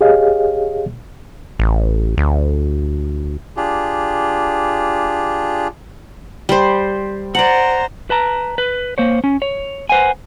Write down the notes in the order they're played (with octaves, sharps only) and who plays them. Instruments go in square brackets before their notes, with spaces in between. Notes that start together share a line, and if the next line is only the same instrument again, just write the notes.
[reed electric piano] G4 G#4 C#5 D#5 F5
[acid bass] A1
D2
[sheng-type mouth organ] D4 F4 G4 G#4
[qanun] G3 C5
[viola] C5 A#5 [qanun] D5 F#5
[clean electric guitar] B4 A5 A#5
B4
A#3 C5 C#5
C#4
C#5
B4 C5 F#5 G#5